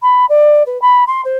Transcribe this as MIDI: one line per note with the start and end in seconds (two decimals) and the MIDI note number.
0.02 0.25 83
0.29 0.63 74
0.66 0.79 71
0.81 1.04 83
1.07 1.21 84
1.24 1.37 72